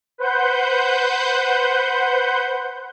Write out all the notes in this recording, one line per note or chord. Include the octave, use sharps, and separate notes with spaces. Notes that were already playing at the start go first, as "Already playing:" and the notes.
B4 C5 F#5 G6